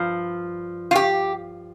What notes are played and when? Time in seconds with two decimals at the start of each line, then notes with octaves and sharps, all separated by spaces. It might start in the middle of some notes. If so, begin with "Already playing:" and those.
Already playing: G2 F3
0.91 F4
0.96 G4